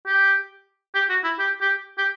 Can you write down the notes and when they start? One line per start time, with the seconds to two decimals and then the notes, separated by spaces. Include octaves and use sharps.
0.06 G4
0.95 G4
1.09 F#4
1.24 E4
1.39 G4
1.61 G4
1.98 G4